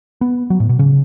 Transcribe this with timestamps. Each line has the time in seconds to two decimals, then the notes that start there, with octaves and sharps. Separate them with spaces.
0.21 B3
0.50 F#3
0.60 A2
0.69 B2
0.79 C#3